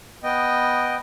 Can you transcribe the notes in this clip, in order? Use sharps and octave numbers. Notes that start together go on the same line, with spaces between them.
B3 D#5 G5